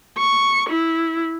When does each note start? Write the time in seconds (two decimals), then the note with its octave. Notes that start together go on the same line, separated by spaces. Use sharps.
0.18 C#6
0.69 E4